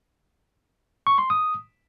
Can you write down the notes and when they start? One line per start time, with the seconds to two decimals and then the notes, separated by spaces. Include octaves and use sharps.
1.07 C#6
1.18 C6
1.30 D#6